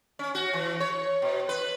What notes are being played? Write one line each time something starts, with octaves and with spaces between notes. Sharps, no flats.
C#4
F#4
E3
C#5
B2
B4